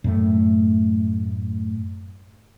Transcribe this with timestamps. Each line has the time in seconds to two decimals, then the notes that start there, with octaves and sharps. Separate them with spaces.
0.04 F#2 A2 A3